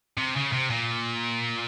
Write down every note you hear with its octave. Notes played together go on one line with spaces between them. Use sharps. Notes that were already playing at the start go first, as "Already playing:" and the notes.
C3
C#3
C3
A#2